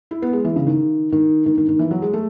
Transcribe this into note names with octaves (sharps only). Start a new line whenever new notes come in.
E4
B3
G#3
E3
C#3
D#3
D#3
D#3
D#3
D#3
E3
F#3
G#3
A3